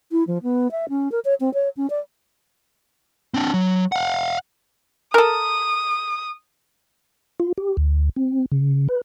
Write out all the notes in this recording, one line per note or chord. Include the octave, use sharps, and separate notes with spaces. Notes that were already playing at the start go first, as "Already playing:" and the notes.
E4
F3
B3
E5
C#4
A#4
C#5
C4
C#5
C#4
D5
C4 D4
F#3
F5 F#5
A4 A#4 D#6
F4
G4
D2
C4
C#3
B4